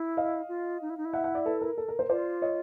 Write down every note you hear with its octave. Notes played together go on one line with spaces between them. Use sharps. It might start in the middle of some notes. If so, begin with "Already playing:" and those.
Already playing: E4
D#5 F5
F4
D#4
E4
D#4
E4
E5 F#5
E5 F#5
D5 E5
A4 B4
A#4
A4
A#4
A#4 C5
F4 C5 D5
C#5 D#5